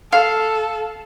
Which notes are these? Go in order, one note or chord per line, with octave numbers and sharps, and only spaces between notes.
A4 F5